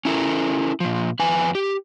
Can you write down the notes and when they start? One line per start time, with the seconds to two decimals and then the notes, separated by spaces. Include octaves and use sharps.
0.05 C#4 E4 A4 A#4
0.80 A#2 F3
1.19 F2 B4 G#5
1.55 G4